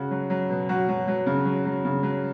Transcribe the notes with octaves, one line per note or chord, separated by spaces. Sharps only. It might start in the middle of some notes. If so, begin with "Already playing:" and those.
Already playing: C#3 F#4
F#3
F#3
B2
F#3 F#4
F#3
F#3
C#3
F#3
F#3
C#3
F#3